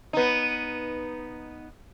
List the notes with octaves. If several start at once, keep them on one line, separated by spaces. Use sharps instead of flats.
B3 D#4